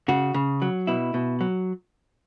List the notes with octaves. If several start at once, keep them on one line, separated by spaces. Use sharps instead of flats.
C#3 F#4
C#3
F#3
B2 E4
B2
F#3